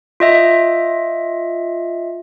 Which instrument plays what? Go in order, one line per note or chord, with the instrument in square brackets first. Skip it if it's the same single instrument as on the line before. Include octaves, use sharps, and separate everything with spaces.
[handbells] F4 D#5 E5